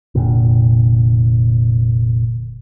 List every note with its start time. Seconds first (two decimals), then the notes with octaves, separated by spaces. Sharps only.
0.15 F1 A#2 D3